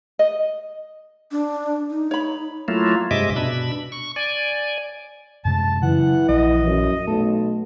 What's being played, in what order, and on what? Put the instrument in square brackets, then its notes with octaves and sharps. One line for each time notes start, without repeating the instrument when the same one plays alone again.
[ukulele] D#5
[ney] D4
D#4
[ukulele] C#5 B5
[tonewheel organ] F#3 A3 A#3 E4 F4
G2 C3 G#3 D#5 E5 D6
B2 D4 B5 E6
C#6
D5 G#5
[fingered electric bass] F#2 C3 G#3 [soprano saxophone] A5
[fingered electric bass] C#3 F#3 [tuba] E3 [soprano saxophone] F#5
[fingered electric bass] A#1 [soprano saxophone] D#5
[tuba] F#2
[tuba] B1 [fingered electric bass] A3 [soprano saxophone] A4